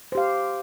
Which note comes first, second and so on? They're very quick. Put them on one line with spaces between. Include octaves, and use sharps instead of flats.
C5 G4 F5